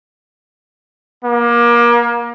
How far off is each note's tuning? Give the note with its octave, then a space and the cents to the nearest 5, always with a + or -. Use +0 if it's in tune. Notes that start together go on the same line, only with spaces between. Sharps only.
A#3 +30